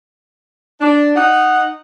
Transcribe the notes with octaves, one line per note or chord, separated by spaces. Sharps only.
D4
D#4 F#5